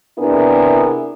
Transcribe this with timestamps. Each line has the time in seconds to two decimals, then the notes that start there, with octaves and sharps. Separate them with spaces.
0.18 C3 B3 D4 E4 G#4 A#4